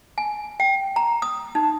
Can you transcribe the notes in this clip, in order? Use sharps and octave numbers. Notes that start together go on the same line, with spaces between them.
G#5
G5
A#5
D#6
D#4